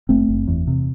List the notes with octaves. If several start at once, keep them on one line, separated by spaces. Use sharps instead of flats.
F#1 A3 C4
F#1
E2
C3